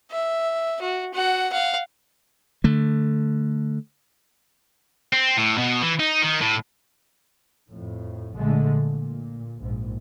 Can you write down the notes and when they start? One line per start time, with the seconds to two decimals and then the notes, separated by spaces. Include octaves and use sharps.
0.11 E5
0.81 F#4
1.14 F#4 F#5
1.52 F5 F#5
2.64 D3 A3
5.13 C4
5.37 A2
5.58 B2
5.82 E3
6.00 D#4
6.22 D#3
6.41 A2
7.68 F2 A2
8.36 A#1 D3 G#3 A3
8.83 A#2
9.59 A#1 G#2